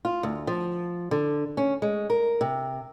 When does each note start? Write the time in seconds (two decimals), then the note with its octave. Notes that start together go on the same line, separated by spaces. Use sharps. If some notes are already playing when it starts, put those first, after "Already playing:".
0.05 F4
0.23 D2
0.47 F3
1.11 D3
1.57 C#4
1.82 G#3
2.10 A#4
2.41 C3